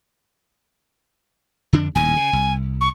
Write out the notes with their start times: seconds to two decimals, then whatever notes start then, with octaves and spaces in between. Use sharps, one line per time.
1.73 F2 D3 D4
1.95 D#1 D#2 A2 G#5
2.17 C#3
2.33 C2
2.81 C#6